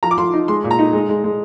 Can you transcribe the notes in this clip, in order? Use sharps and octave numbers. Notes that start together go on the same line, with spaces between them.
F3 A#5
D6
F3 C6
D#4
G#3 C6
A#2
A#5
D#4
G#3
G#3
G#3